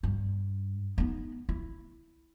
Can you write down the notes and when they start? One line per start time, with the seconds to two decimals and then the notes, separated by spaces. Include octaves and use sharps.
0.03 G2
0.98 B3 D#4
1.49 E4